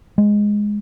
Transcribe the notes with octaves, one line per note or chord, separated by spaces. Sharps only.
G#3